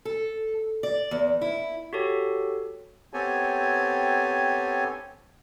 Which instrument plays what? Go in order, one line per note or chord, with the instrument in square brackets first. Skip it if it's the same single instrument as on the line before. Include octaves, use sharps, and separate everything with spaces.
[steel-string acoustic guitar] A4
D5
E2
E4
[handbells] F#4 G4 A4 C#5
[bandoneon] B3 C4 G4 A4 C#5 G#5